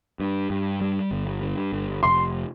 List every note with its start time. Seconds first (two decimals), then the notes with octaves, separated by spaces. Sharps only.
0.20 G2
0.50 G2
0.81 G3
1.11 G1
1.42 G2
1.73 G1
2.03 F1 C6